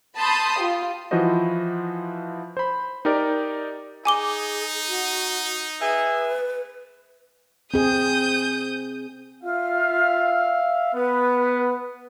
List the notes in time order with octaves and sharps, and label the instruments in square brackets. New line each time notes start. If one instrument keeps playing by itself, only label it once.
[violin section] A5 B5 C6 D#6 G6
F4 G4
[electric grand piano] E3 F3 E4 F#4 C5 D#5
C5 B5
D#4 G4 A#4 D5
[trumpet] D#4 [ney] G#4 [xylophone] G#5 D6 G7
[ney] F#4
[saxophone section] G#4 E5 [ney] B4
[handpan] C4 G#4 [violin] D#6 G6
[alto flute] F4 [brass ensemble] E5 F5
[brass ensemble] B3 [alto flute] B4